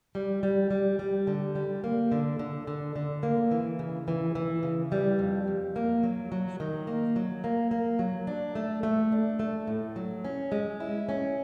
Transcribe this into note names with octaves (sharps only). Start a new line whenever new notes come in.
G3
G3
G3
G3
D3
G3
A#3
D3
D3
D3
D3
A#3
E3
C#3
E3
E3
C#3
G3
F2
F2
A#3
F#3
F#3
D#3
A#3
F#3
A#3
A#3
F#3
D4
A3
A3
D4
A3
A2
F#3
C#4
G#3
E4
C#4